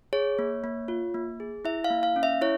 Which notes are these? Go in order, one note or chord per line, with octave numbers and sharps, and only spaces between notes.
G#4 C#5
A#3
A#3
F4
A#3
G#4
E4 E5
F5
A#3
F5
C#4
E5
E4 C#5